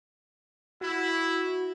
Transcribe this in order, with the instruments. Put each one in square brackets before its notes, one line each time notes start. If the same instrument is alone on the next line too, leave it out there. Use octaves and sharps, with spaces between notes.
[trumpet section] E4 [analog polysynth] F#4